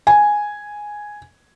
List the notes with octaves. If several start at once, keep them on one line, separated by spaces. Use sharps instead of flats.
G#5